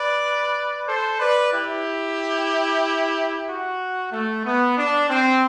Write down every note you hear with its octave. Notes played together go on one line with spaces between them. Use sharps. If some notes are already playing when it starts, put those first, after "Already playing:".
Already playing: B4 D5
A4 C5
B4 D5
E4 G4
F#4
A3
B3
D4
C4